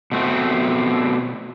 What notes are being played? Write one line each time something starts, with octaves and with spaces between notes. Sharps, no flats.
B2 A3 C4